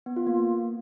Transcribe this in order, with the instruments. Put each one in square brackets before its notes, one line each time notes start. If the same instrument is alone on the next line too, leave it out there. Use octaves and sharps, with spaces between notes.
[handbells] B3
F4
A#3